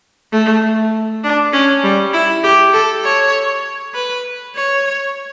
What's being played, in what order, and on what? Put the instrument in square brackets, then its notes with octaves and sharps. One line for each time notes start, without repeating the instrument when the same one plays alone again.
[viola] A3
D4
C#4
G3
E4
G4
A4
C#5
B4
C#5